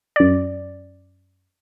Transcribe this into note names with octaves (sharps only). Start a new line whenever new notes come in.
F#2 D5